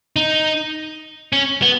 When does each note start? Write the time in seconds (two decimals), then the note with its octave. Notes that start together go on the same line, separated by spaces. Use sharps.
0.16 D#4
1.33 C#4
1.62 B3